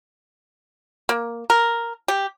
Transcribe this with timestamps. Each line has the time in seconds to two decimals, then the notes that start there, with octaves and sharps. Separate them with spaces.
1.09 A#3
1.50 A#4
2.08 G4